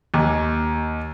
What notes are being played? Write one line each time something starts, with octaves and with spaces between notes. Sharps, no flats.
D#2